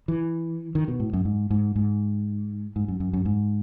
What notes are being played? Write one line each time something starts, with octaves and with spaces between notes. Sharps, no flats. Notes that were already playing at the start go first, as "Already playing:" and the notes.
E3
D#3
B2
A2
F#2
G#2
G#2
G#2
G#2
F#2
F#2
F#2
G#2